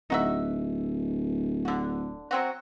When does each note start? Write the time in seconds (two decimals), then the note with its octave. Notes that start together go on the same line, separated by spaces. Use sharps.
0.10 D1 D#4 F#4 E5
1.65 D3 F#4
2.31 F#3 C4 F#4